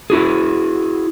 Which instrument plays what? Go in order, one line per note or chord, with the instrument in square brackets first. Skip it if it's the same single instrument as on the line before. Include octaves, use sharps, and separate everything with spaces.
[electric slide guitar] E4 F#4 G#4